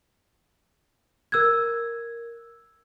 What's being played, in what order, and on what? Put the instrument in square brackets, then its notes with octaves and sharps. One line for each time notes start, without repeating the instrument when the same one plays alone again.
[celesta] A#4 E6 F#6 G#6